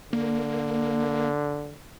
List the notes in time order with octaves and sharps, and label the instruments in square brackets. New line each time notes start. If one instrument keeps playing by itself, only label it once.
[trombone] D3 [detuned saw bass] A#3